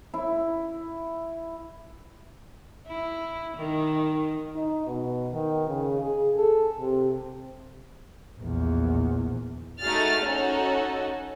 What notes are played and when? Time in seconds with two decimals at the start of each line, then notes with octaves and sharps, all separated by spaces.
0.14 E4
2.87 E4
3.57 D#3
4.56 D#4
4.87 B2
5.33 D#3
5.67 C#3
6.00 G#4
6.36 A4
6.80 C3
8.39 A#1 E2
9.81 A3 D#4 F#4 G#4 F6 A6
10.24 C#4 D#4 F#4 A4